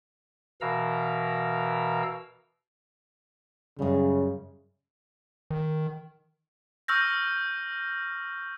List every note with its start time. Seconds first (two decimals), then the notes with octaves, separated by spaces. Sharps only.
0.61 B2 E3 A#4 F5 A#5 E6
3.79 F#2 C#3 G3
5.51 D#3
6.88 C#6 E6 F6 G6 A#6